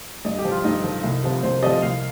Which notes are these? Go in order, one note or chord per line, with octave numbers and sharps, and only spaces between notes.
G2 D#5
G4
F3
F4
G2 D#4
F3
C2
C3 F3
C2 C5
C3 F3 D#5
C2 F5